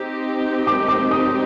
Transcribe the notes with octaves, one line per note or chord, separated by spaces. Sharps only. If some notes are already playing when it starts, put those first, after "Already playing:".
Already playing: C4 D#4 G4
D6
D6
D#6